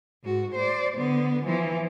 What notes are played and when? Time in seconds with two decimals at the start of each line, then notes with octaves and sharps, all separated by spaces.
0.23 G#2 F#4
0.55 C5 D5
0.97 D3 B3
1.46 E3 F3